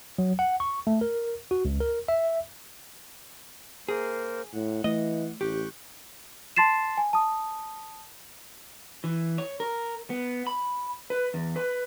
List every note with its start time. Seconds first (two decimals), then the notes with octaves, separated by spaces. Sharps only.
0.18 F#3
0.39 F#5
0.60 C#6
0.87 A3
1.01 A#4
1.51 F#4
1.65 C#2
1.80 A#4
2.08 E5
3.89 A#3 G#4 A#4 C5
4.54 A2 F#5
4.84 E3 A3 D#5
5.41 A1 G4 C#6 F#6 G6
6.56 A5 C6 A6 C7 E7
6.97 G#5
7.13 A5 D#6
9.04 E3
9.38 C#5
9.60 A#4
10.10 B3
10.47 B5
11.10 B4
11.34 E2
11.56 B4